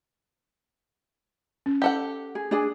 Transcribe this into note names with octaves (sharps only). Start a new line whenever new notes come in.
C#4
G4 A4 F#5
G#4
D4 G#4 G#5